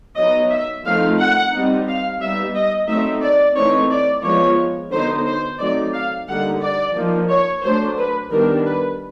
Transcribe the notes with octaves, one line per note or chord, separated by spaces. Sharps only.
F#3 B3 D#4 D#5
E5
F3 A3 C4 D#4 F5
F#5
G3 C4 D#4
F5
G3 B3 D#4 E5
D#5
F#3 A3 C4 D#4 E5
D5
E3 A3 C4 D#4 C#5
D5
F3 G#3 B3 C#5
D3 F#3 B3 D#4 C5
C5
F#3 A3 C4 D#4 D5
F5
D3 G3 A#3 D#4 F#5
D5
F3 A#3 D#4
C#5
F#3 A3 D4 C5
B4
D#3 G3 B3 D4 A#4
B4